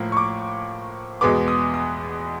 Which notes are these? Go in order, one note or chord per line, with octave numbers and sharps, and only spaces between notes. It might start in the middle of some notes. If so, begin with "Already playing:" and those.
Already playing: A2 F3 A#3
C#6
D6
E2 B2 G#3 B3 D6
D#6
D#6